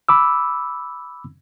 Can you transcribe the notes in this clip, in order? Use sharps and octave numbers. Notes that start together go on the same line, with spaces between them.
B5 D6 E6